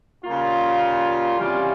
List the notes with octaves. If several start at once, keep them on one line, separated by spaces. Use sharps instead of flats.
C#3 G3 A#3 F4
C3 E3 G3 C#4 F4